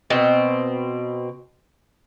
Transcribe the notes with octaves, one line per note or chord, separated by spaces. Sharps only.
B2 C4